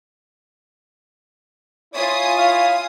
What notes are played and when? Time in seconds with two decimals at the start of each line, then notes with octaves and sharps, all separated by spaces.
1.94 E4 F4 C#5 G#5 D#6
2.38 E4 F5